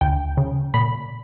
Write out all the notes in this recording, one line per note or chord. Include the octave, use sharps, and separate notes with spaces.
D2 G5
C#3
A#2 B5